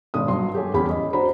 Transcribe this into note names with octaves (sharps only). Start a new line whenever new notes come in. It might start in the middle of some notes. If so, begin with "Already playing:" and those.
G#1 B2 D#6
G2 F#3 C6
G4 A4 C#5 G#5
E2 C#4 G4 C#5 B5
D#5
D4 F#4 C5 A#5 B5